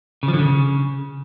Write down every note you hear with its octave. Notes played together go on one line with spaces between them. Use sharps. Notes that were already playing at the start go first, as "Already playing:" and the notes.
C#3
F3
D3
C#3